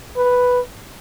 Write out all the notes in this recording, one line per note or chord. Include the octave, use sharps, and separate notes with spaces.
B4